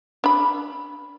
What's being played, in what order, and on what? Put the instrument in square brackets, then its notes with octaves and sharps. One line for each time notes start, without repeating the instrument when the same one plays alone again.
[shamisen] D4 B5